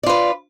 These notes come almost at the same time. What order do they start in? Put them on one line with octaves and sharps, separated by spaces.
D5 F4 B4